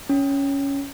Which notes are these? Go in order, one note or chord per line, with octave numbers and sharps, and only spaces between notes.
C#4